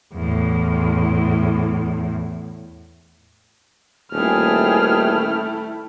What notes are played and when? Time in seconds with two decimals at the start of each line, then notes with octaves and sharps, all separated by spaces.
0.14 E2 A2
4.12 D#1 A3 E4 G#4 G5 F6